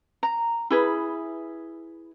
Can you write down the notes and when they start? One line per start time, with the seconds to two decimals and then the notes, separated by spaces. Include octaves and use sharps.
0.23 A#5
0.70 E4 G#4 B4